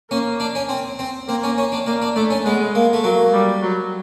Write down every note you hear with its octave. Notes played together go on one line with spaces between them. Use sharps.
A#3 C#4
D4
C#4
C4
C4
A#3 C4
C#4
C#4
D4
A#3 D4
D4
A3 D4
C#4
G#3 B3
A#3
A3
F#3 A#3
G3
F#3